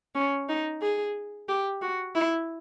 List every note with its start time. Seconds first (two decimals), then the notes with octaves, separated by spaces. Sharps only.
0.15 C#4
0.48 D#4
0.82 G#4
1.48 G4
1.82 F#4
2.15 E4